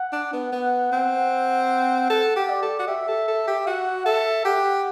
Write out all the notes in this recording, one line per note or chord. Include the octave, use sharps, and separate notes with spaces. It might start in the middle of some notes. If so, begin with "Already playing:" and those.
Already playing: F#5
D4
B3
B3
C4
A4 F#5
G4
D5
A4
F#4
G4 E5
A4
A4
G4
F#4 F#5
A4 E5
G4 F#5